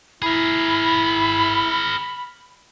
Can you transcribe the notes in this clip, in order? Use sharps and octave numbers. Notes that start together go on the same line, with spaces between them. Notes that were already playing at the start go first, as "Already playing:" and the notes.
E4 G#4 A#4 B5